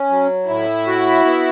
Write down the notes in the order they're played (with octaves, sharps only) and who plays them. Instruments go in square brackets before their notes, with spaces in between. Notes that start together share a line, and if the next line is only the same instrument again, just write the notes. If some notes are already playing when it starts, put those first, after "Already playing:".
Already playing: [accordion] C#4
F#3
[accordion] A2 [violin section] E4
[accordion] F#4
B3